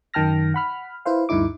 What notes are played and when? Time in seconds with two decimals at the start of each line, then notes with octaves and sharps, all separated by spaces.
0.14 F#2 D#3 G5 A5 F6 A#6
0.54 F#5 B5 F6
1.05 E4 B4 C5 F5
1.29 D2 G2 D3 D#4 E4 D6